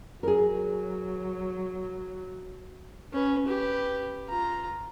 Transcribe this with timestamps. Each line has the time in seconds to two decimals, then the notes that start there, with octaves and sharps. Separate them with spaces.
0.23 F#3 G#4 A#4
3.13 C#4 B4
3.47 G4 B4
4.29 F4 A#5